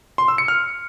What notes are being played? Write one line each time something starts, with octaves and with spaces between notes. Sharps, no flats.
C6
E6
C#7
F6